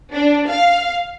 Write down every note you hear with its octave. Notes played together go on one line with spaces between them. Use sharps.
D4
F5